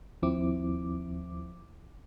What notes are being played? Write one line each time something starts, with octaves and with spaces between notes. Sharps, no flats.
D#2 F3 C4 E4 D6